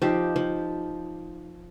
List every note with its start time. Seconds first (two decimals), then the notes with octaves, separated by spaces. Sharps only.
0.02 F3 D#4 G4 E5
0.36 F3